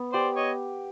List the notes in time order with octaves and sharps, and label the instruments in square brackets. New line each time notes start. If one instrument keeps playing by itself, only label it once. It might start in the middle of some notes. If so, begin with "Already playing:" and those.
Already playing: [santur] B3
[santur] G4 [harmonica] C5 D5
[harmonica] C#5 D#5